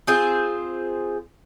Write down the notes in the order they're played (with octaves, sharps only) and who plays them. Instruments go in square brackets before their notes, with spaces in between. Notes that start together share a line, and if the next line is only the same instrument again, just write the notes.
[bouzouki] C4 F4 G#4 C5